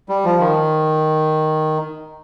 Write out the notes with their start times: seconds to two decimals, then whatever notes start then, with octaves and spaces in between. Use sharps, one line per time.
0.09 G3
0.25 F3
0.40 D#3